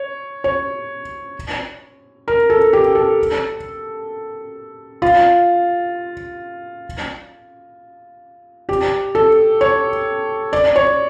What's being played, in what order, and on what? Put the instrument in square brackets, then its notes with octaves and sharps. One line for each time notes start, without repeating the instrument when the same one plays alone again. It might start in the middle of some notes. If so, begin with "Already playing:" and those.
Already playing: [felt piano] C#5
C#5
A#4
A4
G4
A4
F4
G4
A4
C#5
D5
C#5